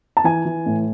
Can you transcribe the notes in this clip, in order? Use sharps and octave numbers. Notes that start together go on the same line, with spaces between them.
A5
E3 G#5
E3
A2